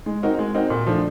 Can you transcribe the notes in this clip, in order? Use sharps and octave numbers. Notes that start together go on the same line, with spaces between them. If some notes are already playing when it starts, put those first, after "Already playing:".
G#3
C4 D#4 F#4 A#4
G#3
C4 D#4 F#4 A#4
A#2
F3 A3 D4